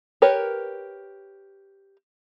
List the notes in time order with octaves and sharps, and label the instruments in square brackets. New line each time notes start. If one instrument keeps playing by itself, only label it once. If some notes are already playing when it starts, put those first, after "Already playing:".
[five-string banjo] G4 A#4 B4 C#5